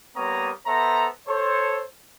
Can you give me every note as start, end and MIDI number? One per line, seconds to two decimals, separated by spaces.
0.16 0.50 55
0.16 0.50 58
0.16 0.50 59
0.16 0.50 73
0.16 0.50 82
0.16 0.50 87
0.67 1.07 59
0.67 1.07 69
0.67 1.07 72
0.67 1.07 76
0.67 1.07 82
1.28 1.83 69
1.28 1.83 72
1.28 1.83 73